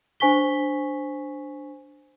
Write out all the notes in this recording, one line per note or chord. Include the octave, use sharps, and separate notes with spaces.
D4 C5 G#5 C#6 B6 G7